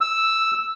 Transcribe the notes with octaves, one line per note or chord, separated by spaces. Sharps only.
E6